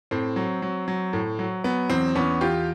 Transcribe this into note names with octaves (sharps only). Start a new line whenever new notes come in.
A2 C4
F#3
F#3
F#3
A2
F#3
F#3 B3
E2 C4
E2 B3 C#4
E2 F4 G4